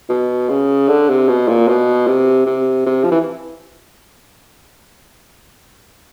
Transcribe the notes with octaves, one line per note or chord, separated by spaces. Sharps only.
B2
C#3
D3
C3
B2
A#2
B2
C3
C3
C3
F3
E3